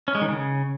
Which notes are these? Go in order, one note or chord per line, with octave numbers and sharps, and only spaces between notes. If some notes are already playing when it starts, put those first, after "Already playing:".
C#4
G#3
D#3
C#3